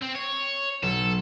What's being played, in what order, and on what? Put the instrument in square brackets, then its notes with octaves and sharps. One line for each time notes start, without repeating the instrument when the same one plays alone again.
[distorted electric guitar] C4
C#5
[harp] B1 [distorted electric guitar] A4